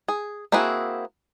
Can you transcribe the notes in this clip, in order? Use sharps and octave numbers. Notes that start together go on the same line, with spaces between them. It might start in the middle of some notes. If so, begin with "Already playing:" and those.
G#4
A#3 C4 E4 F#4 G#4